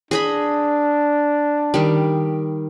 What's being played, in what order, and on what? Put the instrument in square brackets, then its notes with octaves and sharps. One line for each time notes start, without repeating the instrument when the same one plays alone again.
[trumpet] D4 [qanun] G#4 D#5 B5
[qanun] D#3 G3